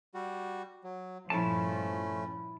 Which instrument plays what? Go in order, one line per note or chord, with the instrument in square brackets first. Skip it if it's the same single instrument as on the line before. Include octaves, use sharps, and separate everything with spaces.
[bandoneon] G3 F#4
F#3
[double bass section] G2 A#2 F3 [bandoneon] A3 C#4 [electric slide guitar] E4 A5